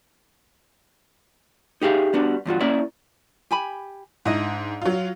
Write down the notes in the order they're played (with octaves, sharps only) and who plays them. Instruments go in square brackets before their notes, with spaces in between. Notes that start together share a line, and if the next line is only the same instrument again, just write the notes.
[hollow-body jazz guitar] D#4 G4 G#4 E5 F5
G3 B3 D4 F#4
E2 G2 F4 F#4
A#3 C#4 E4 D5 E5
[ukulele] G4 G#5 B5
[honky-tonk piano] G#2 [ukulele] D4 E4 D#5
[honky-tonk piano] F#3 F4